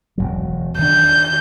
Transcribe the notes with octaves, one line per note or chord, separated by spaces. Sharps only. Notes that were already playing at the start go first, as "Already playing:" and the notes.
E1 C2 F#3
D#3 D4 G6